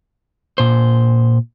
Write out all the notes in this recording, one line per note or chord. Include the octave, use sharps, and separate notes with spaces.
A#2 C5